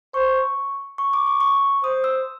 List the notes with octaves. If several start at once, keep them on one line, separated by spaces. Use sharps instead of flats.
C5 C#6
C#6
D6
C#6
C#6
C5 D#6
E6